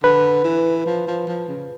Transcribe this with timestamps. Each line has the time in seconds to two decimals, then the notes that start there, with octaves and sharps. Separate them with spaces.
0.03 D3 B4
0.44 E3
0.86 F3
1.07 F3
1.27 F3
1.48 C#3